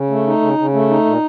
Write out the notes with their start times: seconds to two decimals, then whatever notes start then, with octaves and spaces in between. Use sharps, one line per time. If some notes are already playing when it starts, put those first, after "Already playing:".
Already playing: C#3
0.10 A3
0.27 D#4
0.41 C#3
0.58 C#3
0.74 A3
0.89 D#4
1.05 A#2